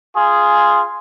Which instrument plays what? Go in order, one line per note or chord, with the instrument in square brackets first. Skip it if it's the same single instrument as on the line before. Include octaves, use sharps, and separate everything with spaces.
[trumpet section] F4 G#4